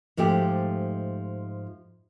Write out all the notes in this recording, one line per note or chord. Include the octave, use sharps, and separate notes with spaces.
G#2 F3 A3 G4